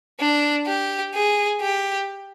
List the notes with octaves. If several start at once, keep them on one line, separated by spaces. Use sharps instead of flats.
D4
G4
G#4
G4